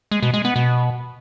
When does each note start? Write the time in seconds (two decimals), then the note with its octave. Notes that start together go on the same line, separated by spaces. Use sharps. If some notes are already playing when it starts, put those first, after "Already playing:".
0.11 G#3
0.22 B2
0.34 G#3
0.45 B3
0.56 B2